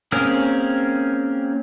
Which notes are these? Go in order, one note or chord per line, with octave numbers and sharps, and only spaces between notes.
A#3 C4 C#4 G#4 A#4